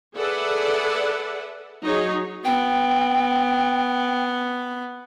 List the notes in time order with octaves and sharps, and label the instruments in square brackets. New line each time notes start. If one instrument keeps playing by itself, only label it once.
[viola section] G#4 A4 B4 D5 E5 F#5
F#3 D#4 G#4 C#5
[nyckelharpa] B3 [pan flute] G5